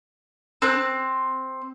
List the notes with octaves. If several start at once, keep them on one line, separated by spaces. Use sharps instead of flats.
C4 F#6